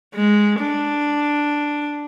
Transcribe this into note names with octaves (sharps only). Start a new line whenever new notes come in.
G#3
D4